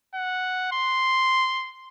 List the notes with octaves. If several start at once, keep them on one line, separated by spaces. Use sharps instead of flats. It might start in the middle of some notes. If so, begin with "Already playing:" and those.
F#5
C6